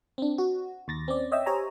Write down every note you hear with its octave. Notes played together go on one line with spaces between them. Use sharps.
C4 D4
F#4
D#2 A6 A#6
C4 C#4 D5
C#5 D#5 E5 G5 E6
G4 C5 C#5 G#5 A#5